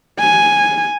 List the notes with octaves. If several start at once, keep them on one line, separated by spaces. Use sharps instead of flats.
G#5